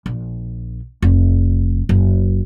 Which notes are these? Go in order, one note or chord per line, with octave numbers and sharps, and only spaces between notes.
A#1
F1
F#1